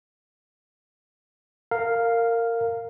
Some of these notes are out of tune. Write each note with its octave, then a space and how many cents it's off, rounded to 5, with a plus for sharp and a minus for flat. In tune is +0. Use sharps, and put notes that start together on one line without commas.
A#4 -20 F5 +0